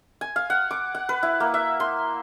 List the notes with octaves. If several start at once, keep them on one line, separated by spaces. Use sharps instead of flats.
G#5
F5
F#5
D6
F#5
B4
E4
A#3
E5
C6